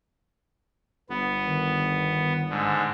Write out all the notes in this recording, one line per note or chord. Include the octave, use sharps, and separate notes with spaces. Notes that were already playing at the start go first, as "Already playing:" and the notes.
G1 B3
D#3
G#2 D3